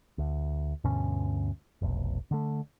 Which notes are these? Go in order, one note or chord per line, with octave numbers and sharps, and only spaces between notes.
D2
D2 G2 B2 C#4
F1 B1
D3 A3